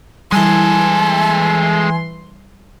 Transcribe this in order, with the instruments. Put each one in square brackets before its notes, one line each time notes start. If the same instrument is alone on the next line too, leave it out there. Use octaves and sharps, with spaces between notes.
[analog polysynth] E3 C6 [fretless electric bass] G3 [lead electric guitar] G#3 A4 [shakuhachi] G#5